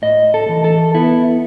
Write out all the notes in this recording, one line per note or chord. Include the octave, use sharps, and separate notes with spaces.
A2 D#5
A4
E3
A4
B3 E4